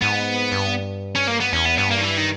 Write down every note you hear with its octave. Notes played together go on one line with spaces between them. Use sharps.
G#2 B3
G2
C#4
A#3
B3
E2 C#4
B3
G2 B3
A#3
D#3
E3
D#3